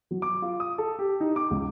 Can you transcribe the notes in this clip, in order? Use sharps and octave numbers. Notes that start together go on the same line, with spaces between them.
F#3
D6
F4
D#6
A4
G4
D#4
D6
C#2